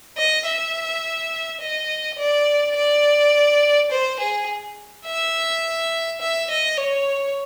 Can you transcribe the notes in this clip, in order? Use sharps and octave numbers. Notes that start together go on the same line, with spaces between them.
D#5
E5
D#5
D5
D5
C5
G#4
E5
E5
D#5
C#5